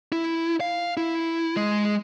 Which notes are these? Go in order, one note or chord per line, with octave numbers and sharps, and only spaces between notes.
E4
F5
E4
G#3